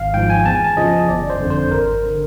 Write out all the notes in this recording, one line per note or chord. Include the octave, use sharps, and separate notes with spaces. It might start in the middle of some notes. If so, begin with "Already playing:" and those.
Already playing: G#1 F5
G#2 F3 G5
G#5
E2 A5
G#5
A5
C#3 F3 D#5
G1 D5
C5
F2 D3
C5
G#1 A#4
D3